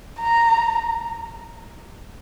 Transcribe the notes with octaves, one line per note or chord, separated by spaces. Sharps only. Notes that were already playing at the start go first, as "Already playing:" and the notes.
A#5